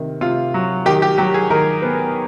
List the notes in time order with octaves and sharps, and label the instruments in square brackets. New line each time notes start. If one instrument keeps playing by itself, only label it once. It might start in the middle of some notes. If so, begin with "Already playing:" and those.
Already playing: [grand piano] C3 D#3
C3 F4
F#3
D#3 G4
G4
F#3 G4
G#4
D#3 A#4
B3 B4